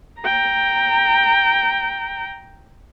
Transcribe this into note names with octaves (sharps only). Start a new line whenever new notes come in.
G5 A#5